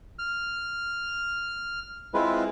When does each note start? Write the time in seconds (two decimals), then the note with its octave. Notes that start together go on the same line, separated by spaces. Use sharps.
0.19 F6
2.14 G#3 C4 E4 F4 B4